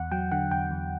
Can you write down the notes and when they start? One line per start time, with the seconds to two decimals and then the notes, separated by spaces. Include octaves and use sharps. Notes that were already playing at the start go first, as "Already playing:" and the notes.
Already playing: E2 F#5
0.12 F#3 G5
0.32 D3 F#5
0.51 E2 G5
0.71 E2